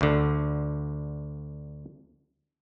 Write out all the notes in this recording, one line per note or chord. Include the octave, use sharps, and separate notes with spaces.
D2 D3